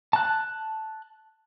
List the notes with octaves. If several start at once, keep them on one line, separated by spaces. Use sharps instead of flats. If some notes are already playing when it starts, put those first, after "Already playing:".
A5 F#6